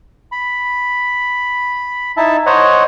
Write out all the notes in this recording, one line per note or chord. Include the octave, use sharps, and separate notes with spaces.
B5
D#4 E4 E5 A5
C5 C#5 D#5 F#5